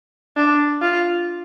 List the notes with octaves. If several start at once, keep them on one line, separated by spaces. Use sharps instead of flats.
D4
F4